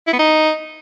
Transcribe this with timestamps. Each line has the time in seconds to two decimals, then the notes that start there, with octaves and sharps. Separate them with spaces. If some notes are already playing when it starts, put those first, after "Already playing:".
0.07 E4
0.13 B3
0.19 D#4